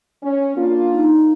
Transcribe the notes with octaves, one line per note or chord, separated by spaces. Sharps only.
C#4
A#3 D4 F4
D#4